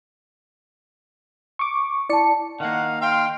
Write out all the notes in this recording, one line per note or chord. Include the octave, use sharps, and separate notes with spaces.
C#6 D6
E4 D5 A5 C#7
D#3 A#3 F5 F#5
F5 G5 C6